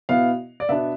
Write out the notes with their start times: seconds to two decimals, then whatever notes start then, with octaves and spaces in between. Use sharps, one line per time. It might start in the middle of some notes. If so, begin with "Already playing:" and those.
0.09 B2 B3 E4 F5
0.60 D5
0.69 B2 B3 D4 E5